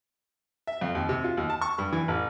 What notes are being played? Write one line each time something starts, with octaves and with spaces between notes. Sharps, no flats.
E5
F2
D#2
C3
F4
D#2
A5
C#6
G2
E3
A1